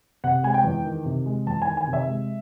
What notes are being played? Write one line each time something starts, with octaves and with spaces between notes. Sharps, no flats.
C3 F#5
G#3 G#5
G5
E2
D#3
C3
G#3
E2 A5
G#5
D#3
G#5
C3
E5
G#3